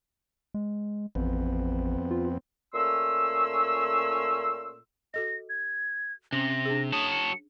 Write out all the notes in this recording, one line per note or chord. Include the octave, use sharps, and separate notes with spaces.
G#3
A1 F2 B3 C4
F4
A#2 A3 C#4 C6 E6
F#4 A4 D#5 A#6
G#6
C3 C#4 A#6
D4 G#4
F#3 C#5 A5 D#6
C#7